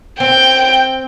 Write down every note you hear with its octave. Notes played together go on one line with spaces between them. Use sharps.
C4 G5